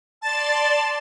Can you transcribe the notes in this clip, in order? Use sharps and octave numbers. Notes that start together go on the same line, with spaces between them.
D5 A5 C6 A6